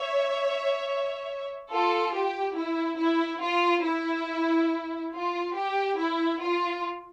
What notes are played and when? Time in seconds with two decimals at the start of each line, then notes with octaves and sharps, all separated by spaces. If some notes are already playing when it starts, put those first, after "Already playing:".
Already playing: C#5 E5
1.70 F4 A4
2.13 G4
2.56 E4
2.98 E4
3.42 F4
3.84 E4
5.14 F4
5.56 G4
5.98 E4
6.42 F4